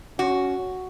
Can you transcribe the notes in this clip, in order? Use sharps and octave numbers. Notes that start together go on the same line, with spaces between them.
C#4 F#4